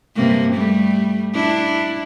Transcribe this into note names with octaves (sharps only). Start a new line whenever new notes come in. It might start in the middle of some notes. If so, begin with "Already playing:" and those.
G2 C3 A#3
G3 A3
D4 E4